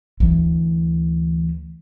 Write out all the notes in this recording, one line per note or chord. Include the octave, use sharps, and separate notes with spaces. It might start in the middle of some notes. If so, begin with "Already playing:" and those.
D2 E3